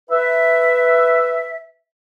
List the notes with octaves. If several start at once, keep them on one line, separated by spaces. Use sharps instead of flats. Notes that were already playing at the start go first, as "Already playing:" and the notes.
B4 E5